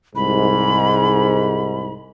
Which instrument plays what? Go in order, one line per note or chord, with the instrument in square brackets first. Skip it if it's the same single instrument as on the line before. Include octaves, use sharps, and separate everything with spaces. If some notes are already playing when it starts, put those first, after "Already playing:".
[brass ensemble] C2 G#2 [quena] B5